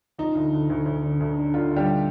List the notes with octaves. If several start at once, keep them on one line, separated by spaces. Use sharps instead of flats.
F3 D#4
D2
D2
D2
D2
D3
D2
D3
D3 F4
D3
G3 G4